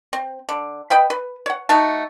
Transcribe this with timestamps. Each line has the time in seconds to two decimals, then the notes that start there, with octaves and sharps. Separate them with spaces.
0.13 C4
0.49 D3
0.90 B4 D#5 G5 B5
1.10 B4
1.46 C#5 F#5
1.69 A3 D#4 F#4 A5